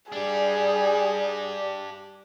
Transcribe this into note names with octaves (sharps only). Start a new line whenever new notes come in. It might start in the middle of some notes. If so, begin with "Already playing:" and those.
G3 D4 G4 G#4